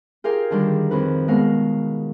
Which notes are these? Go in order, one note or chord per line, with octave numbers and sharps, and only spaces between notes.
F4 G4 G#4 A#4 F5 G5
D3 D#3 G3
F2 D#3 B4
B2 G#3 B3 A#4 F5